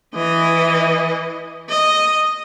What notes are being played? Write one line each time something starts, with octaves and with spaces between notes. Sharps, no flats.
E3 D#5
D#5